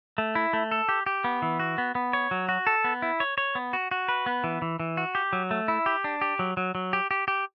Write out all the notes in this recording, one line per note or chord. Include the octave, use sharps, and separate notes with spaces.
A3
E4
A3
A4
G4
G4
B3
E3
F#4
B3
B3
C#5
F#3
F#4
A4
B3
E4
C#5
C#5
B3
F#4
F#4
B4
B3
E3
E3
E3
F#4
G4
F#3
A3
E4
G4
D4
G4
F#3
F#3
F#3
G4
G4
G4